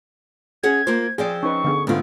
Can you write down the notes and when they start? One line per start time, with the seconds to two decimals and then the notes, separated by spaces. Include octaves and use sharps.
0.63 C#4 G#4 F#5 G#6
0.87 A#3 F4 C5
1.18 F3 C4 G#4 D5
1.43 C#4 D#4 B4 C#6
1.64 D3 B3 G#4
1.87 G#2 D3 A3 B3 F4